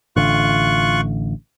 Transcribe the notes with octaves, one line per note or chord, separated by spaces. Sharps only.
A1 D3 F4 C#6 F#6